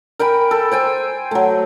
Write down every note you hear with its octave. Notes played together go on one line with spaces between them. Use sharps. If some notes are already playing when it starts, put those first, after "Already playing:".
A#4 G5 G#5 B5
A4
C5 G5 G#5
F#3 A3